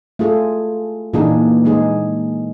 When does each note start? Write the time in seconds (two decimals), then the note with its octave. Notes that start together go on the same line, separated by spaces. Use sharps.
0.19 A3 F4 G#4 A4
1.13 A#2 E3 A#3 D4 D#4 G#4
1.65 G#3 D#4 G#4